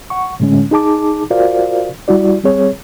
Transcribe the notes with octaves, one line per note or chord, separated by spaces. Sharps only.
F#5 C#6
A2 D3 G#3 C#4
D#4 G#4 A5 D6
F4 F#4 A#4 C5 D5 F5
G3 E4 F#4 D5
G3 C4 G#4 C#5